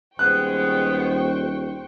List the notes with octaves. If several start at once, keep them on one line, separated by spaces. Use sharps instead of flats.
D#1 G#3 B3 C5 G5 C#6 F#6